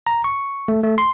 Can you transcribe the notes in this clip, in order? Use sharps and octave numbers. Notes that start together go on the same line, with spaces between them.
A#5
C#6
A3
A3
C6